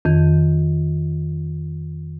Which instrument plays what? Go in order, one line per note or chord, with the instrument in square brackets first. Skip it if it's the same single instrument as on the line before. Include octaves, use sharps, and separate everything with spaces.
[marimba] F2 D#3